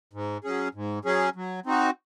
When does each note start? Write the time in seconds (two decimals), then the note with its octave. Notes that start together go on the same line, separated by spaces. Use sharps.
0.13 G#2
0.44 F#3 C#4 G#4
0.75 G#2
1.05 F#3 C#4 G#4
1.36 F#3
1.66 C4 D#4 F#4